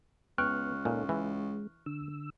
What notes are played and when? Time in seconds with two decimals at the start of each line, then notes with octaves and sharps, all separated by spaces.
0.38 C#2 B3 G5 C#6 F6 F#6
0.85 A#2 D#4 A4 C#5
1.09 E3 G#3
1.86 D3 E6